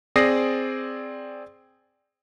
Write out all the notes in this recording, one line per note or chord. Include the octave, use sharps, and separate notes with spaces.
C4 G#4 D5 D#6 A#6 C7